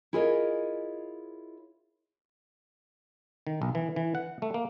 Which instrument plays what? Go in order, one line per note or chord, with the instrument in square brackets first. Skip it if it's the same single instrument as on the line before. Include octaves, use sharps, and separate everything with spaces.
[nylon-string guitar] E4 F4 G#4 A#4 C#5 D#5
[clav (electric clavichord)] D#3
B1
E3
E3
F#5
A3
A#3